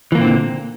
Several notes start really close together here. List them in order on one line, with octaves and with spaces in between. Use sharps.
E3 A#3 A#2 C4 D3